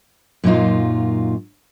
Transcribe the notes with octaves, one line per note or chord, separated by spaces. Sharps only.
F#2 A#2 F#3 D#4 F4